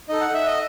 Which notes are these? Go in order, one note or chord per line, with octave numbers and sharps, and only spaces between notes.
D#4 A4 D#5
F#5
E5
D#5